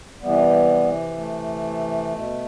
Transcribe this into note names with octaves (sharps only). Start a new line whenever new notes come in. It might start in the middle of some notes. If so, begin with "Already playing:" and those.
C3 E3 G3 B3
A3
B2